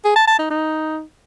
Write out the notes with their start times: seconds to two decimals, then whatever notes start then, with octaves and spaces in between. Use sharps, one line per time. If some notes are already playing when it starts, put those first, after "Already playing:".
0.05 G#4
0.16 A5
0.28 A5
0.39 D#4
0.51 D#4